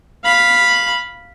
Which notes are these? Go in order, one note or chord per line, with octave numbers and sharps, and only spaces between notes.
F5 B5